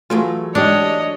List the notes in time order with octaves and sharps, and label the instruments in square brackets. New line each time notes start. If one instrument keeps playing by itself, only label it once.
[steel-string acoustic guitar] E3 F#3 A3 [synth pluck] F4 G#4
[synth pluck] G#2 G#3 G4 [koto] D4 [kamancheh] C#5 D#5